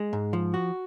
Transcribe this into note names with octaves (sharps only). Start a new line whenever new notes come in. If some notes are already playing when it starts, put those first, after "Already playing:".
Already playing: G#3
G#2
F3
F#4